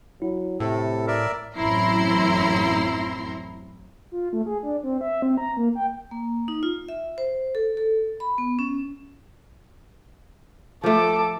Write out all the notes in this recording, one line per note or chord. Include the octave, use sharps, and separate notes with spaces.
F#3 E4
A2 C3 A4
A#4 D5 E5
A1 F#2 C4 E4 A#5 C6
F4
A3
G#4
D4
C4
E5
C4
A#5
A#3
G5
A#3
D#4
F4
E5
C5
A4
A4
B5
B3
C#4
F3 A3 A4 D6